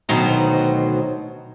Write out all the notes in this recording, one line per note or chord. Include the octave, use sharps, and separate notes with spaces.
D2 B2 D#3 F#3 C5 A#5